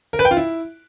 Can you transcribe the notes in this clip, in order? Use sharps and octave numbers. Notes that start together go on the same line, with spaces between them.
A#4
B4
G5
F4
E4